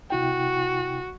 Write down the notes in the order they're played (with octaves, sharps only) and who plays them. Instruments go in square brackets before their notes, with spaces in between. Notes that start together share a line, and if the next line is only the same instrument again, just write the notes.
[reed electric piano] C3 E4 G5 [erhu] F#4